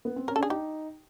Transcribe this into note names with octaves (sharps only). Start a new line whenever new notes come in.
B3
C4
C#4 A#4
A4
D4 G#4
D#4 G4